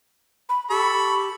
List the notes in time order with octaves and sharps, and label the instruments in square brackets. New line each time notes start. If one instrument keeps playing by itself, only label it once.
[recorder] B5
[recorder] G4 [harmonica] A4 B5 C#6